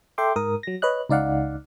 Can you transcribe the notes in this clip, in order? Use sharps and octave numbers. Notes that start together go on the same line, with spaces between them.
A4 E5 G5 C6 D6
G#2 A#4 D#6
F#3 A#6
B4 C#5 D#5 F#6
C#2 D#4 D5 F5 F#5